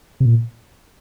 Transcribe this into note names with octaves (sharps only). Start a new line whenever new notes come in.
C3
A#2